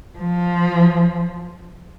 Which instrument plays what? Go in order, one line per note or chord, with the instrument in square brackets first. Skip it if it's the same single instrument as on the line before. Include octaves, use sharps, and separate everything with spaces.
[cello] F3